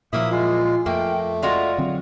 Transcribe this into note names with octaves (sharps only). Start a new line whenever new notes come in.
A#2 F3 F#3 A#3 E4 E5 D#6
G#3 F4
F2 A3 A#3 G5
G#3 F4 F#4 D5
D3 F#3 C4